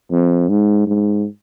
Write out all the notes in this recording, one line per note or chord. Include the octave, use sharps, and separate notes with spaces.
F2
G#2
G#2